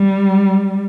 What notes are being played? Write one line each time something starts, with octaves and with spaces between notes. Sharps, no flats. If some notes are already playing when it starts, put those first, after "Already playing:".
Already playing: G3